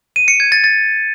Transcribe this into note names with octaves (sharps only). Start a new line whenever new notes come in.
D#7
C#7
G#6
A6
A6